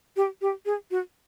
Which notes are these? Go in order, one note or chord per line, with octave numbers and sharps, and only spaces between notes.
G4
G4
G#4
F#4